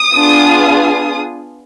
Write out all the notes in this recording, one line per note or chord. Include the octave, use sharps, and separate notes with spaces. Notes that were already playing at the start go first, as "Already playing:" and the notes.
Already playing: D#6
B3 D4 F4 G#4